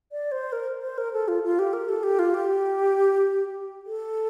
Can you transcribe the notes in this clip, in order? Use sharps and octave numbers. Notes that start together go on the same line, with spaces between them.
D5
C5
A#4
C5
A#4
A4
F4
F4
G4
A#4
A4
G4
F4
G4
A4